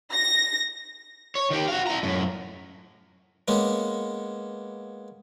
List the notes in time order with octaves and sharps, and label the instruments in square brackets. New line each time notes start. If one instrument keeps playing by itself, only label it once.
[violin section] A#6
[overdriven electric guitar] C#5
D#3 G4
F#4 F5
E4 A#5
F#2 A2
[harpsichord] G#3 A#3 B3 C#4